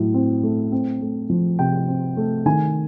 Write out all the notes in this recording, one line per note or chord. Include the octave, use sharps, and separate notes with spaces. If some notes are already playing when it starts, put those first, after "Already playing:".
Already playing: A2 F#3
C4
A3
C4
A3
F3
C3 G5
C4
A3
D#3 G#5